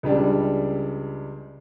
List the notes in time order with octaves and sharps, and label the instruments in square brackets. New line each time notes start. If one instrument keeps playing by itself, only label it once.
[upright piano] C#2 C#3 G3 D4